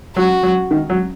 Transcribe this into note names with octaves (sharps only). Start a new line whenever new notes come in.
F#3 F#4
F#3
D#3
F#3